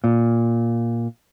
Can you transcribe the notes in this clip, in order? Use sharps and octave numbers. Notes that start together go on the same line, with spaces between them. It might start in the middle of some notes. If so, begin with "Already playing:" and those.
A#2